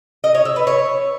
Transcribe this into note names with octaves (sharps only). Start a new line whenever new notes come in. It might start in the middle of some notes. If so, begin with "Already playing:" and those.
D#5
C#5
E5
B4
C#5